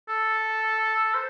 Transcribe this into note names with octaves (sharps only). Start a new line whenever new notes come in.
A4
C5